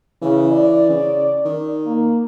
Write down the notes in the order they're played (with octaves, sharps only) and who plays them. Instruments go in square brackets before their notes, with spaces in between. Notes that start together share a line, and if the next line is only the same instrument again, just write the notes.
[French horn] C#3 [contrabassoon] E3
[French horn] D5
[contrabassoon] C#3
D#3
[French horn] A#3